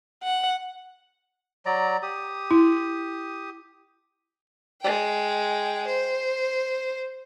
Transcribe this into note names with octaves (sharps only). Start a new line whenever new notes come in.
F#5
F#3 D5 A#5
G4 D#6
E4
G#3 G5
C5